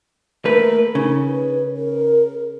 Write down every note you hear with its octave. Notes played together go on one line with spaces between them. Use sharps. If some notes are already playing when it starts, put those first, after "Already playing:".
A3 A#3 A#4 B4
C#3 D#4
B4
A#4